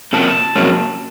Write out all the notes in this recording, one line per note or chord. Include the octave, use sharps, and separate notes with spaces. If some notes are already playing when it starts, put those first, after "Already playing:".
C3 F3 A#3 C#4 A5
F2 C3 F#3 A#3 C#4